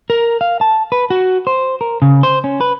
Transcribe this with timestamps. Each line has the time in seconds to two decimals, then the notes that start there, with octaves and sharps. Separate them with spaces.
0.10 A#4
0.41 F5
0.61 A5
0.92 B4
1.10 F#4
1.47 C5
1.81 A#4
2.02 C#3
2.23 C5
2.44 C#4
2.61 B4